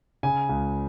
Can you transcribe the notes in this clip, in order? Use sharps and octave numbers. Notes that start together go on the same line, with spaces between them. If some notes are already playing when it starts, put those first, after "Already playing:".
C#3 G#5
C#2